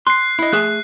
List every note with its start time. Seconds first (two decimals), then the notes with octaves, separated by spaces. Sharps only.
0.07 C6 F#6 C7
0.39 E4 D#5
0.53 A3 G#4 E5 F#6